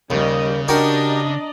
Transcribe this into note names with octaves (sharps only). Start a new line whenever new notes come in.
D#2 C#3 G3 D#5
D4 F#4 G4 A#4 D5 D#5 A#5